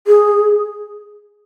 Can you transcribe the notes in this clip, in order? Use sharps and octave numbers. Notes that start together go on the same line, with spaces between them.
G#4